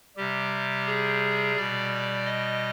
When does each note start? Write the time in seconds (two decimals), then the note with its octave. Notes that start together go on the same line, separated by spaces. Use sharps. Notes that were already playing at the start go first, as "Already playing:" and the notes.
0.17 C3 G3 G4
0.86 G#4
1.56 B2 G3 D5
2.25 D#5